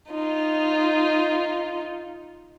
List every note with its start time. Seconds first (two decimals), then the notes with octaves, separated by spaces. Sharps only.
0.11 D#4 F4